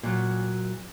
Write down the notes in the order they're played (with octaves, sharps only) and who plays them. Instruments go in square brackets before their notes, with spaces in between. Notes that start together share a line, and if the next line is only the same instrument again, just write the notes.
[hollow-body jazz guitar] A#2 F#3